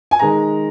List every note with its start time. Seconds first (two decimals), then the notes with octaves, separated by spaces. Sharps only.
0.11 G#5
0.19 D#3 G#3 A#5